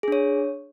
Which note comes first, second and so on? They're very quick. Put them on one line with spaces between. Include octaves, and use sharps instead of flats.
G#4 D4 C#5